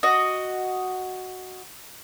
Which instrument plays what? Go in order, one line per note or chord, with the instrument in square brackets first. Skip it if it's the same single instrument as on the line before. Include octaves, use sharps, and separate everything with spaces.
[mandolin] F#4 D#5